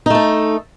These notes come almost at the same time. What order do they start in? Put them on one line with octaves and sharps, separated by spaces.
D#4 A3 A4